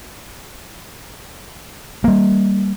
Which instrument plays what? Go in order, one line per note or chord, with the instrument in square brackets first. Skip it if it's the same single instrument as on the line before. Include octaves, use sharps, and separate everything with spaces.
[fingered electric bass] G3 A#3